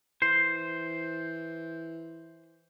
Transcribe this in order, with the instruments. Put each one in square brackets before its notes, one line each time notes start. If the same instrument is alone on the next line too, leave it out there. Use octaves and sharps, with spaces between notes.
[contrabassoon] E3 [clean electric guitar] C5